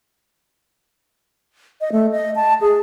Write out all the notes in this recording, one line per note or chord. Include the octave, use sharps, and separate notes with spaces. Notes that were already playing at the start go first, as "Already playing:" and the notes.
D#5
A3
D#5
A5
G#4